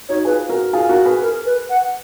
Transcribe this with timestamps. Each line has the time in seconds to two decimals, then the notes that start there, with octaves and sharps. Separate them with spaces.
0.09 D#4 F#4 C#5
0.25 F4 G#4 B4
0.49 F#4 A#4
0.73 F4 G#4
0.89 F#4 A#4
1.05 G#4 B4
1.22 A#4
1.45 B4
1.70 F#5